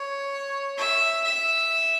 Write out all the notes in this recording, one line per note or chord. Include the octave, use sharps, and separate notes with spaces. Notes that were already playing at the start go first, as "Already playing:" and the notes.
Already playing: C#5
E5
E5